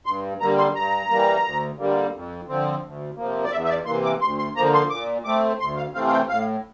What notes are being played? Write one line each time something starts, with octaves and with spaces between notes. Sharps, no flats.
G2 C6
D3 G3 A#3 A#5
C6
G2 A#5
E3 G3 A#3
D2
D3 G3 A#3
F2
D3 F3 C4
D2
C3 F3 A#3
D5
E2 E5
E5
D5
C3 E3 A#3 C6
D6
D2 C6
C6
D3 F3 A#3 A#5
C6
A#2 D6
A3 C4 D6
D2 C6
F5
C3 E3 A3 C4 F5
F5
G5
A2 F5